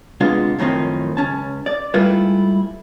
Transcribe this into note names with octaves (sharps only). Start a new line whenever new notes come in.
C3 G#3 B3 D4 F4
F#2 A2 D#3 F3 C4
C#2 C#4 A5
D5
G#2 G3 A3 E4 F4 B4